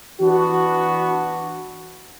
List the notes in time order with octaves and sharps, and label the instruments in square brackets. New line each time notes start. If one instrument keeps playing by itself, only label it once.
[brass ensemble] E3 B3 D4 F#4